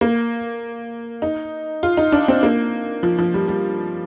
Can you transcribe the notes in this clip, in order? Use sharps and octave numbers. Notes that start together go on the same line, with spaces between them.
A#3
D#4
F4
D#4
D4
C4
A#3
F3
F3
G3
G3